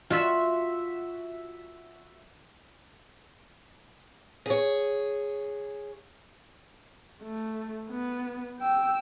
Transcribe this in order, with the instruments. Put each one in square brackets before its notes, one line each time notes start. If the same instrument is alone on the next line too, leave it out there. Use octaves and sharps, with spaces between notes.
[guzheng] F4 [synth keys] F#4 E5
[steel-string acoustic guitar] G#4 C#5
[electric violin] A3
B3
G5 E6